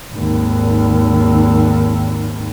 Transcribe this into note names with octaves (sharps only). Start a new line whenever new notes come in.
G#1 D#2